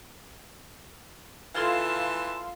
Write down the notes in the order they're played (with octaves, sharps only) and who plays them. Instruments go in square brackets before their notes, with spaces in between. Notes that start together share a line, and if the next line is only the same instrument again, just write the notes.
[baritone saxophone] E3 [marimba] F4 A4 G#6 [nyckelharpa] E5 A5 [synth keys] F5 C6